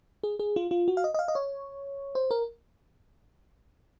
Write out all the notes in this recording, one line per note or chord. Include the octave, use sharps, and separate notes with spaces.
G#4
G#4
F4
F4
F#4
F5
D#5
D#5
F5
D#5
C#5
C5
A#4